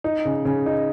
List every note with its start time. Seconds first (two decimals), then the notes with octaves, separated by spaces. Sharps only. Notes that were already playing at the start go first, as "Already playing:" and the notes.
0.04 D#4
0.25 C#3
0.45 C#3
0.66 D#4